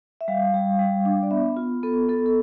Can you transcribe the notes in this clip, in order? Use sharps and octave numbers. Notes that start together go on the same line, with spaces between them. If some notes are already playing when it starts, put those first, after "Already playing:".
E5
G3 F5
G3
G3
D4
D5
B3 E5
F4
B3 A4
B3 A4
A4